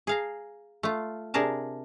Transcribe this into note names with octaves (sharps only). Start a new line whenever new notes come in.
G#4 F5 A#5
A3 F4
C3 D4 G#4 A#4 A5